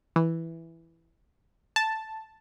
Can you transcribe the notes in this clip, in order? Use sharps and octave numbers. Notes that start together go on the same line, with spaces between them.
E3
A5